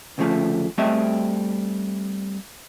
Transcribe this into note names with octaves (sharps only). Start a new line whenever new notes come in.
D2 C#3 F3 G#3 A3
G3 A3 C4 G4 D#5 E5